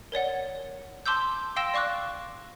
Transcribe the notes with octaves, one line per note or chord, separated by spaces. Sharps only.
A#4 C#5 D5 F#5
A5 C6 D6 E6 G6
F5 G5 C6 E6 A#6 E7
D5 F5 C#6 D6 F#6